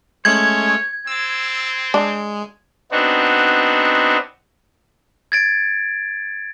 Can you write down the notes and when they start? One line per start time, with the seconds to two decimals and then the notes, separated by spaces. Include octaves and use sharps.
0.25 G#3 A3 C#4 C#5 G#6
1.07 C4 E6 A6
1.94 G#3 D4
2.91 B3 C4 D4 D#4 F#4
5.32 G#6 A6 D7